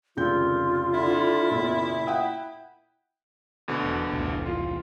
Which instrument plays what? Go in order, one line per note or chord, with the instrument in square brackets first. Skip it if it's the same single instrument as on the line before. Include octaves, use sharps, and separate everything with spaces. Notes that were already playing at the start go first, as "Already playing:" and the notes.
[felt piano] F1 C#2 G6 [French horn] D#3 [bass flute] F4
[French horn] D3 [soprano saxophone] E4
[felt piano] F#1 B1 [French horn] A#2
[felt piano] F#5 G5 D#6
[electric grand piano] D2 B2 D3
[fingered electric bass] E1
E1 C2 A2
[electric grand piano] F4